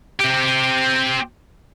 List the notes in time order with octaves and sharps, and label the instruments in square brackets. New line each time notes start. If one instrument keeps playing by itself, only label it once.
[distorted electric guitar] C4 G4